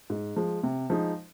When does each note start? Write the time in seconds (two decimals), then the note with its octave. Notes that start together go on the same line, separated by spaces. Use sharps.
0.10 G#2
0.36 F3 G#3
0.63 C3
0.90 F3 G#3 D#4 G#4